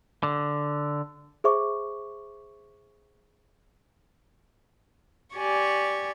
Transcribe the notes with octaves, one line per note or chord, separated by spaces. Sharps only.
D3
G#4 C5 E5 C#6 D6
G4 D5 G#5 C#6